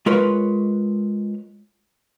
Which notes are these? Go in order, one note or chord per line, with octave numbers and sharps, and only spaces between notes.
G#3 F4 A#4 B4 C#5